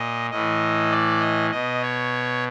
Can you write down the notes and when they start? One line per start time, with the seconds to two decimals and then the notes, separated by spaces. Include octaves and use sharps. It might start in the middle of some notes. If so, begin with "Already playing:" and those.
Already playing: A#2 D#5
0.30 A2 E3 D#5
0.91 D5
1.20 D#5
1.50 B2 D#5
1.81 C#5